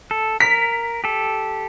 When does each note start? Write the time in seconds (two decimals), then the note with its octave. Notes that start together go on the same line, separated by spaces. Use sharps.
0.11 A4
0.40 A#4 B6
1.04 G4 A4